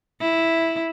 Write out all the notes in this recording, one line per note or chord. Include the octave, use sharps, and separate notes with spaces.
E4